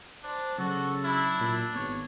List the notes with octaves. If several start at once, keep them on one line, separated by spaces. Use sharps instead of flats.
D4 C5
C#3 F#3 F#4 A4
D4 E4
A#2
G#1 B3 C#5